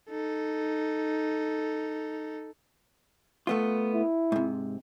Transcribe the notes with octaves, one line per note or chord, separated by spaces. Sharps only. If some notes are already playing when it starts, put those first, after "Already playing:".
D#4 A4
A3 B3 F4
E4
G#2 C3